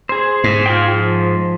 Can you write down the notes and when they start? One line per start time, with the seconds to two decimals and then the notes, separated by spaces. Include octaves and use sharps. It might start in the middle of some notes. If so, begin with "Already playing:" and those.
0.09 G#4 C5
0.44 G#2
0.66 F4 G#4 G5
0.93 F3